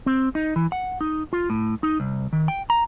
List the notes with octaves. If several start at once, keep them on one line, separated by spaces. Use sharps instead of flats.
C4
D#4
E3
F#5
D#4
F4
A2
D#4
C2
D#3
G5
A#5